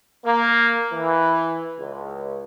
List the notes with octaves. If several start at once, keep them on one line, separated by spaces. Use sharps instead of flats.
A#3
E3
C#2